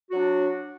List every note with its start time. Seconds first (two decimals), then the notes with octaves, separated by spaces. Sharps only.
0.10 F#4
0.13 F#3
0.15 D4